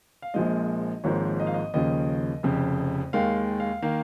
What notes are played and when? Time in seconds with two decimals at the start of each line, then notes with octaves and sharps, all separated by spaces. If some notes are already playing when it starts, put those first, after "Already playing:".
0.22 F5
0.34 A#1 A#2 F3 G#3 D#5
1.04 G#1 G#2 F3 A#3 C#5
1.40 D#5
1.47 F5
1.54 D#5
1.74 D#2 C#3 F3 D#5
2.43 F1 F2 C#3
3.13 D#2 D#3 G#3 F5
3.60 F5
3.82 D#3 A#3 F5